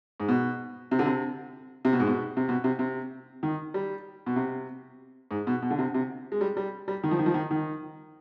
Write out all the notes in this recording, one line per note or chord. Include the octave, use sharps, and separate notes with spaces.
G#2
B2
C3
D3
C3
C3
B2
G#2
B2
C3
B2
C3
C3
D#3
G3
B2
C3
G#2
B2
B2
D3
C3
C3
G#3
G3
G3
G3
D#3
F3
D#3
F3
D#3
D#3